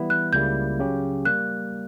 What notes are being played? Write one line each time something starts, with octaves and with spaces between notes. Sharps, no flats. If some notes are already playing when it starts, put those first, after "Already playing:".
Already playing: E3 G3 B3 E4
F#6
C#2 C#3 G3 A#3 E4 G6
C#3 F#3 C#4 G4
G3 A#3 F#6